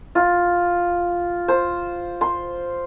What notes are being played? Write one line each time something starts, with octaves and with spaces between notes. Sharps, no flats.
F4
C5
C6